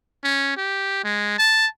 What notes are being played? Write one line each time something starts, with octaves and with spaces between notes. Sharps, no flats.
C#4
G4
G#3
A5